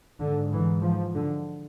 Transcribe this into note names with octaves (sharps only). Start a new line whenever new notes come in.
G#2 D3
E3
F3
D3